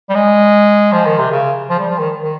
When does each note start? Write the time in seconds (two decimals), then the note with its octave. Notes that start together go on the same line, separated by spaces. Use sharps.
0.09 G3
0.15 G#3
0.92 F3
1.06 D#3
1.19 C3
1.31 C#3
1.70 F3
1.79 G3
1.90 F3
1.99 D#3
2.22 D#3